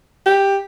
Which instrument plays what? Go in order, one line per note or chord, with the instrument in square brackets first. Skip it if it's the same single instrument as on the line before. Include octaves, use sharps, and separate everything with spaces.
[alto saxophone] G4